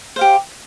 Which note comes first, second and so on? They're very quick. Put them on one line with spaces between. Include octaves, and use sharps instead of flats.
C5 F5 G4